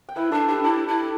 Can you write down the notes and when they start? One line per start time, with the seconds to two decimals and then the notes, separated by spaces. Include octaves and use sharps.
0.09 G5
0.16 E4 B4 E5
0.32 D4 A4 D5
0.48 D4 G4 B4
0.64 E4 A4 D5
0.88 E4